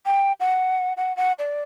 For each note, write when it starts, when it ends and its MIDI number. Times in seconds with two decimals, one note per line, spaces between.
0.06 0.32 79
0.40 0.93 78
0.97 1.15 78
1.17 1.32 78
1.39 1.63 74